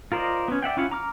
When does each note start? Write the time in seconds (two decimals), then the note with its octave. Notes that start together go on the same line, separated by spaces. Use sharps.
0.12 F4 A#4 C5 D5 D#5
0.48 B3 C#4
0.63 D5 E5 F#5 G5
0.77 C#4 E4 F4 F#5
0.91 A#5 D6 F6